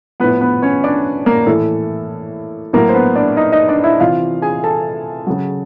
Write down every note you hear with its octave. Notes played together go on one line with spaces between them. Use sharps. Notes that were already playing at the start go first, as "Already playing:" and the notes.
A2 F3 B3 B4
B3 B4
C#4 C#5
D4 D5
A#3 A#4
A2 E3 A4
A2 F#3 A#3 A#4
C5
B3 B4
D4 D5
D#4 D#5
D#4 D#5
D4 D5
E4 E5
C3 E3 F4 F5
G#4 G#5
A4 A5
C#3 F#3